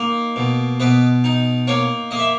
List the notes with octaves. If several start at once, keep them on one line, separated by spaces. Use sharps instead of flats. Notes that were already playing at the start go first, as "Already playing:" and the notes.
Already playing: A#3 D#4
B2
B2 B4 D#5
D#4
A#3 A#4 C#5
A#3 D#5
E5